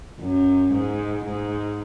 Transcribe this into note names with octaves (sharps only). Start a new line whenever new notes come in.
F#2
G#2
G#2